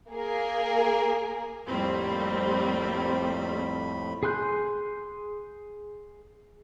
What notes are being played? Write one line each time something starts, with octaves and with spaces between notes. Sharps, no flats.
A#3 G#4 A#4
F2 A2 G3 A#3 C4 B5
G#4 G#5 C6 F#6 G6